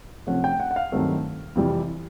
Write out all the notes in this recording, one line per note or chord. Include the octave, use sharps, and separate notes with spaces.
C3 F3 A3 C#4 F#5
G5
F#5
F#5
F5
G2 D#3 F#3 A3 C4
F2 C3 E3 G3